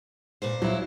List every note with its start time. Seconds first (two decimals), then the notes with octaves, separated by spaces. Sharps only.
0.42 A#2 B4 C5
0.62 F#3 G3 E4 F4